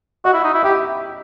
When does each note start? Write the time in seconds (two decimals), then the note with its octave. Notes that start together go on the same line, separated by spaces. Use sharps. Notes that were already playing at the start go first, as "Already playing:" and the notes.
0.25 F#4 D#5
0.34 E4
0.44 D#4
0.54 E4
0.63 G4 E5